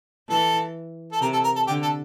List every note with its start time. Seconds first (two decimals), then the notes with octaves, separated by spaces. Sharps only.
0.29 E3 A4
1.12 A4
1.21 C3 A#4
1.33 A4
1.44 A#4
1.56 A4
1.67 D3 G4
1.83 A4